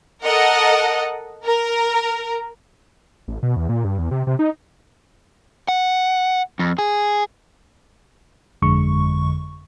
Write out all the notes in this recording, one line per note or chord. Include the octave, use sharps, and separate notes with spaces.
A4 A#4 D#5 F#5
A#4
A1
B2
E2
A#2
G2
E2
C3
C3
D#4
F#5
F2
G#4
G1 F2 D3 G#3 C#6